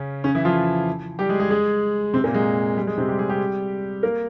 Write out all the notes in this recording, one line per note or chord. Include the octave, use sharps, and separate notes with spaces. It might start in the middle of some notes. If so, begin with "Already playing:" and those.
Already playing: C#3 C#4
C#3 C#4
E3 E4
F3 F4
G3 G4
G#3 G#4
G#3 G#4
G#3 G#4
C3 C4
A#2 A#3
G#3
G3
G#3
C3 C4
G3 G4
G#3 G#4
G3 G4
A#3 A#4